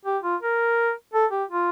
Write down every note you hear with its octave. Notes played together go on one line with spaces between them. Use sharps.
G4
F4
A#4
A4
G4
F4